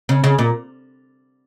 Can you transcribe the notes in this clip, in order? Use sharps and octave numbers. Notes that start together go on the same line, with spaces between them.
C#3
C#3
A#2